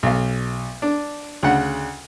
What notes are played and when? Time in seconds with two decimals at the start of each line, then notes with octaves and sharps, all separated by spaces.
0.03 B1 F5
0.82 D4
1.43 D2 C#3 F#5